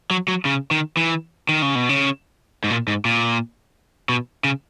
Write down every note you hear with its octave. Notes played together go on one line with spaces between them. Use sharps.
F#3
F#3
C#3
D#3
E3
D#3
C#3
B2
C#3
G#2
A#2
G#2
A#2
B2
C#3